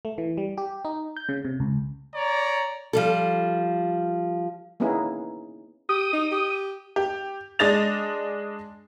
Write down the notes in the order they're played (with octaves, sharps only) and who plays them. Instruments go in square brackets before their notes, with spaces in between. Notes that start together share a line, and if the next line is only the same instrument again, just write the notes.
[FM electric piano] A3
E3
G3
G4
D#4
G6
C#3
C3
C#2
[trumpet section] C#5 D5 A#5
[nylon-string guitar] F3 G3 A4
[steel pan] A#3 B3 C#4 D#4 E4 G#4
[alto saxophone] G4 [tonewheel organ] D#6
[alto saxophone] D#4
G4
[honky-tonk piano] G4
G#3 D4 D#5 A6 F7